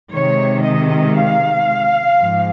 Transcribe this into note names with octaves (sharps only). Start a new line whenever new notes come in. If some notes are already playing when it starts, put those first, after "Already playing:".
C3 D#3 G#3 C#5
D#5
F5
G#2 F3 G#3